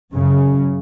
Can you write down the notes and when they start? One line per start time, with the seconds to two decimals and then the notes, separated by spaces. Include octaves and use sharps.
0.13 F#2 C#3